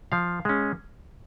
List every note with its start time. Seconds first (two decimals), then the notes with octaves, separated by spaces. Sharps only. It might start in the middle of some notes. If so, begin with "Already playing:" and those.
0.12 F3 F5
0.45 G#3 C#4